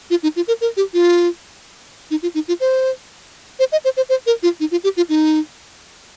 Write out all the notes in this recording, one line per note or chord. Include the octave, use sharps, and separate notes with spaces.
F4
D#4
F4
A#4
A#4
G4
F4
D#4
F4
D#4
F4
C5
C5
D#5
C5
C5
C5
A#4
F4
D#4
F4
G4
F4
D#4